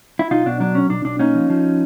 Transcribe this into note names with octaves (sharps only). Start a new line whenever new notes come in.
E4
B1 D#4 F4
B2 D4
F#3 D4
B1 C#4
B1 D4
B1 D4
A#3 C#4 D#4
F3
F3